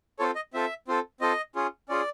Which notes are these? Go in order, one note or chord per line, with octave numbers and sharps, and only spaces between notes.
C4 F4 A4 C#5
D#5
C4 F4 A4 E5
C4 F4 A4
C4 F4 A4 D#5
C#4 F4 G#4
C#4 F4 G#4 D5